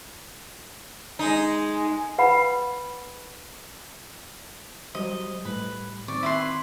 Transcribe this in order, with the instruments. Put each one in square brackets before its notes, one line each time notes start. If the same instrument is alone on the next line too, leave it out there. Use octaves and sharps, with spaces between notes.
[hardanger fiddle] G#3 [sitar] D#4
[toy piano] B4 F#5 G5 B5
[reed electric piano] F#3 G3 C5 [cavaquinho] D#5
[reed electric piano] A2 G3 [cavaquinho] B4
[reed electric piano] D#3 C4 C#6 [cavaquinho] D5
[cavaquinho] E4 B4 C6